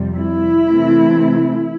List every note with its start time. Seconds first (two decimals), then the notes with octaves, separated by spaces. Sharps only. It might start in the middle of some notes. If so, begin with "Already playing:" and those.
Already playing: F2 C3 G3
0.17 E4
0.67 C3 E3 A3 C4